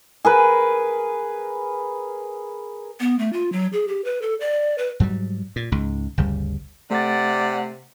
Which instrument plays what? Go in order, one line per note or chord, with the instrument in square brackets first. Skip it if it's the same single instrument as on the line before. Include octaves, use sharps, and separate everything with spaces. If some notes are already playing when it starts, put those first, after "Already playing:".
[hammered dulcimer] G#4 A#4 B4
[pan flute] B3
A3
F4
F#3
G#4
G4
B4
A4
D5
B4
[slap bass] G#2 F#3 G3
A#2
C#2 G#2
G1 D2 C#3 G3
[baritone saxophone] C3 [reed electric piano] A3 A6 [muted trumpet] D5 [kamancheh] F#5